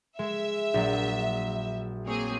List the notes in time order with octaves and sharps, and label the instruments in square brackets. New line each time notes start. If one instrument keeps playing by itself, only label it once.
[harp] G#3 [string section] E5
[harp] A#1 F#3
[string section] A#3 C4 G#4 [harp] C#5